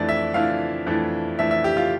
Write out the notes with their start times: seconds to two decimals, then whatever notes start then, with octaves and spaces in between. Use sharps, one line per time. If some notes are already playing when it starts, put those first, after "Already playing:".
Already playing: F2 E3 A3 D4 D5
0.09 E5
0.34 F2 E3 A3 D4 F5
0.86 F2 E3 A3 D4
1.39 F2 E3 A3 D4 E5
1.51 E5
1.64 G4
1.77 F4